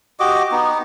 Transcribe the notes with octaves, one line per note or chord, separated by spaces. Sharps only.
F#4 G4 D#5 D6
B3 D#4